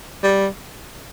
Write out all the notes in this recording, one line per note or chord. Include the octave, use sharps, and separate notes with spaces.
G3